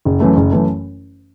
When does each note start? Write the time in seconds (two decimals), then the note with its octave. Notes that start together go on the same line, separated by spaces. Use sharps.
0.05 F#1
0.20 F#2 E3 A3
0.36 F#1
0.52 F#2 E3 A3